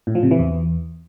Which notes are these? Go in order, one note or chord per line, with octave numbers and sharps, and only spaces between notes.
A2
F3
C3
E3
E2